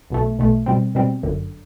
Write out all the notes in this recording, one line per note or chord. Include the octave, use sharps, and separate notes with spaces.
B1 B2 A3
B1 B2 A3
B2 G3 C4
B2 G3 C4
G1 F#2 D3